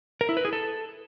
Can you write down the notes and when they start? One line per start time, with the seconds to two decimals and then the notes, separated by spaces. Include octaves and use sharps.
0.21 A#4
0.29 E4
0.37 B4
0.45 G#4
0.53 A4